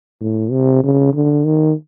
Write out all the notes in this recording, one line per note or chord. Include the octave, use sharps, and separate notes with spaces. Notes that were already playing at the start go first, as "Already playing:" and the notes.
A2
C3
C#3
D3
D#3